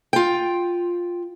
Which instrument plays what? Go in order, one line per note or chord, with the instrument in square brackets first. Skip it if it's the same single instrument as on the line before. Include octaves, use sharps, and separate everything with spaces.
[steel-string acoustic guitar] F4 G5